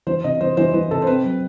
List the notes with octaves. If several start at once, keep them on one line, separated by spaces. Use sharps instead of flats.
E3 C5
C3 D#5
E3 C5
E3 C5
E3 B4
C3 A4
C5
C4 B4
F#3